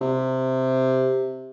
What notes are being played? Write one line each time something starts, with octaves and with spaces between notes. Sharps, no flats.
C3